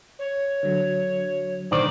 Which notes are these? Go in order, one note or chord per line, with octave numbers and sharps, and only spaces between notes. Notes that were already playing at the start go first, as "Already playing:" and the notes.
C#5
D3 F#3
B1 A2 D3 D#3 C5 D5